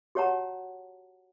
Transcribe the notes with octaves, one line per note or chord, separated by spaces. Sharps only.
F#4 G4 C#5 F#5 A5 A#5